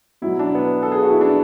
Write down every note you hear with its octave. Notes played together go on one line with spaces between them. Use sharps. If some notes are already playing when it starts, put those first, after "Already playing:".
B2 F#3 E4
D4
B3
A4
G#4
F#4
E4
D4